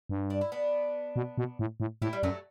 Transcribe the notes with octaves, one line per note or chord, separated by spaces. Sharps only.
G2
D4
E4
B3 D4
B2
B2
A2
A2
A2 E4 G4
G3
F#2 F#3 A3